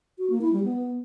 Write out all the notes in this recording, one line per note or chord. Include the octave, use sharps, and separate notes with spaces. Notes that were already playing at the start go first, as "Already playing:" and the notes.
F#4
A#3
E4
G3
B3